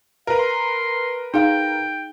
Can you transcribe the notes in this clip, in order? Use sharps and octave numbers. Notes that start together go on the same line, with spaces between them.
A#4 B4 F5
C6
D#4 G#4 F5 G5